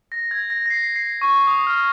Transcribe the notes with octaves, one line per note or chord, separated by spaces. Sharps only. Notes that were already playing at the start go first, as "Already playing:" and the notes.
A#6
G#6
A#6
A#6
C7
C7
C#6
D#6
F6